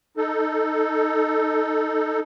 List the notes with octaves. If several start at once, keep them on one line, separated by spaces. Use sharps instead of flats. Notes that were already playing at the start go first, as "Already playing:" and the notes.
D#4 A4